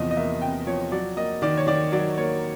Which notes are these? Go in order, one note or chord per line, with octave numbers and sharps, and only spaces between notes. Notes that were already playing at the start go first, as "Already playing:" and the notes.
Already playing: E2 C3 F3 D#5
D#5
A#3 E5
C3 G5
F3 C#5
F#3 D5
A#3 D#5
D#3 D5
C#5
D#3 D5
F#3 D5
A#3 C#5